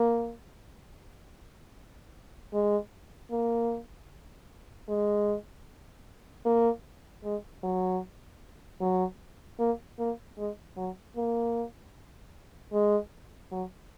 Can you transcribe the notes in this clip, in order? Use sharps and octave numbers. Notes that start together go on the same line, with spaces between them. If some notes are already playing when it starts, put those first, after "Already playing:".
Already playing: A#3
G#3
A#3
G#3
A#3
G#3
F#3
F#3
A#3
A#3
G#3
F#3
A#3
G#3
F#3